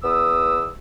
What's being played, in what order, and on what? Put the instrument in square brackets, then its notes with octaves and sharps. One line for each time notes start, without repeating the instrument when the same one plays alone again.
[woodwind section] E2 B3 D#6 E6